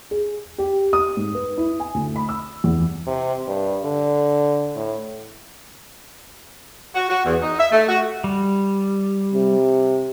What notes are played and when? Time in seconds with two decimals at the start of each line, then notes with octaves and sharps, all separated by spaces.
0.11 G#4
0.58 G4
0.93 D#6
1.17 G#2
1.35 B4
1.57 E4
1.80 G#5
1.94 D2
2.16 B5
2.29 E6
2.64 E2
3.07 C3
3.48 G2
3.84 D3
4.76 A2
6.95 F#4
7.09 F#4
7.25 E2
7.42 D#4
7.59 E5
7.72 A3
7.89 F#4
8.24 G3
9.34 C3